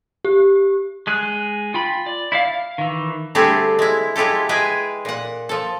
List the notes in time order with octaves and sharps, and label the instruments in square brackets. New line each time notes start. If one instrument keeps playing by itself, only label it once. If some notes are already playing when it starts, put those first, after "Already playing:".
[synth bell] G4
[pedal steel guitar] G#3 G#4 F#6
F4 G5 B5
D5
E4 D5 F5
F5
D#3 E3
[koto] D3 G3 A3 C4 G4 G#4
G#3 E4
G#3 E4 F4 G4 A4
G#3 G#4 B4 G5 G#5
A#2 F#5
F3 A4